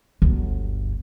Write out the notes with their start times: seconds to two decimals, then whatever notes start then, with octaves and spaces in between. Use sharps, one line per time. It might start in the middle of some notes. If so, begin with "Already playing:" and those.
0.22 G1 D2